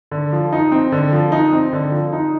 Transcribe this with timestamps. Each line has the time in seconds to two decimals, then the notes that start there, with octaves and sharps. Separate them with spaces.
0.11 D3
0.33 F3
0.53 D#4
0.72 C4
0.92 D3
1.12 F3
1.32 D#4
1.53 C4
1.73 D3
1.92 F3
2.13 D#4